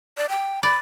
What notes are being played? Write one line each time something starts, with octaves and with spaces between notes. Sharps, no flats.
D5
G5
D5 B5